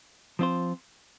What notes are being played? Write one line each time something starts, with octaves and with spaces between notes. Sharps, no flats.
F3 C4 F4 C5